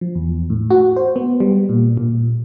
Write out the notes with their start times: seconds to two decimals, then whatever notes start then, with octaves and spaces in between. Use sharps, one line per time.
0.01 F3
0.15 E2
0.50 A2
0.71 F#4
0.97 C5
1.16 B3
1.40 G3
1.69 A#2
1.97 A#2